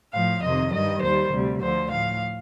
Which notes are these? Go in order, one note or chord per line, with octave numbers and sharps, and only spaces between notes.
A2 F3 F5
F2 C3 D#3 D#5
G2 D#3 G3 D#5
D#2 D#3 G3 C5
D2 C3 G3
D2 D3 F3 C5
A2 F3 F5